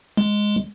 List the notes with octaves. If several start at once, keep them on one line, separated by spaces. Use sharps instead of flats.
G#3